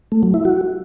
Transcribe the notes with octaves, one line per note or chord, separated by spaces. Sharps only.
A3
F#3
E4
F#4